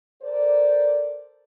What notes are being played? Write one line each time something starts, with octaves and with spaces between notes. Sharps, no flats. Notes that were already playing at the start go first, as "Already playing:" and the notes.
A4 A#4 C5 D5